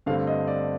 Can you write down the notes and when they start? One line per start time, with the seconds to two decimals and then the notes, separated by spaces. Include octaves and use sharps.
0.06 G2 D3 A3 C4 F5
0.27 D#5
0.47 D5